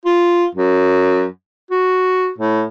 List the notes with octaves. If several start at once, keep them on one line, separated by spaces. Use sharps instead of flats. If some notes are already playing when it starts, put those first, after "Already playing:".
F4
F#2
F#4
A2